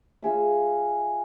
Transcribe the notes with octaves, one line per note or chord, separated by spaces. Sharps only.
F4 G#4 E5